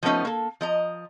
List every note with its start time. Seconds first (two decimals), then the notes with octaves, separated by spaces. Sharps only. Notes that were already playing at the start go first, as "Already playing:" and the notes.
0.03 F3 G#3 A3 B3 C#4 D#4
0.25 A#3 A4
0.61 F3 D#5 A#5